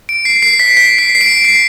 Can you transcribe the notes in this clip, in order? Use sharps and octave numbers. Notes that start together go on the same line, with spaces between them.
D7
C7
C7
B6
B6
C7
C7
D7
C7